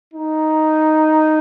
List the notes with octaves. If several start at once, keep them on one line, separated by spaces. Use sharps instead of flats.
D#4